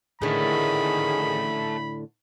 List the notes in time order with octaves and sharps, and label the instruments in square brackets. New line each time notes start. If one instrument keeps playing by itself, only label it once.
[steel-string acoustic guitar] A2 D3 [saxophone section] D#3 G#4 [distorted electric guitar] A3 C#4 [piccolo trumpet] B5